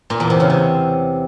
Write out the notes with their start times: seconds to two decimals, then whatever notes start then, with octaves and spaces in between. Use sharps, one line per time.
0.10 A#2
0.20 E2
0.30 C3
0.40 C#3
0.50 C3